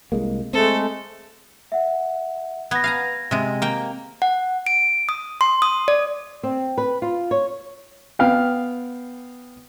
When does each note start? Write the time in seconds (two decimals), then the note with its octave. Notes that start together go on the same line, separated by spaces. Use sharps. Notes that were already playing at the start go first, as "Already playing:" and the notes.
0.12 C2 G#3 A#3
0.53 G#3 A3 C4 A4
1.72 E5 F#5
2.71 B3 G#6 A#6
2.84 F5 G#5 A#5
3.31 C3 G#3
3.62 A#3 G5
4.22 F#5
4.67 D7
5.09 D#6
5.41 C6
5.62 D#6
5.88 D5
6.43 C4
6.78 B4
7.02 F4
7.31 C#5
8.19 B3 F5 G5